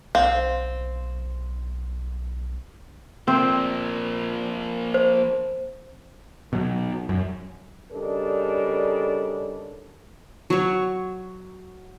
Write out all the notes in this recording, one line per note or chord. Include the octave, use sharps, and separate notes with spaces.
B1 C4 F5
F3 A#3 C4
C5
B2 F#3
F#2
C#3 G3 D4 D#4 A4 A#4
F#3 C#5